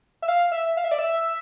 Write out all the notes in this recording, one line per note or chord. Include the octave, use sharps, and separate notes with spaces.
E5
F5
E5
F5
E5
D5
E5